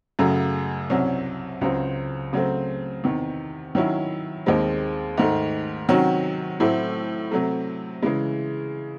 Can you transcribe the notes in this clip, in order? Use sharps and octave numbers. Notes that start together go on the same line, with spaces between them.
F#2 C#3 F#3 A3
C2 C3 F#3 C#4
C#2 C#3 F#3 C4
C#3 F#3 A3 C4
E2 C3 D#3
D#3 F#3 C#4 E4
D#2 D#3 G#3 C4
G#2 D#3 A3
C3 D#3 F#3 C#4 F#4
A2 F#3 A3 C4 E4
C3 F#3 A3
C#3 E3 G#3